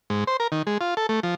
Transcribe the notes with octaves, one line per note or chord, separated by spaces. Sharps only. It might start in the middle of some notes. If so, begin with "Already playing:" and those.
G#2
C5
A#4
D#3
G#3
F4
A4
A3
F3